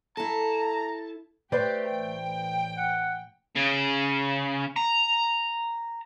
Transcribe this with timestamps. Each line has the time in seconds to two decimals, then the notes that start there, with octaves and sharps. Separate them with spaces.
0.17 E4 A4 A5 A#5
1.52 A3 G4 B4 C5 D5
1.87 A1 G5
2.77 F#5
3.56 C#3
4.76 A#5